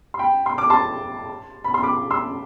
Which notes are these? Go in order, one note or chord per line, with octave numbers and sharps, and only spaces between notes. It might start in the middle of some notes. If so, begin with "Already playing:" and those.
C6
G5 B5
C6
D6
A5 C6
B5
C6
B5 D6
C6 E6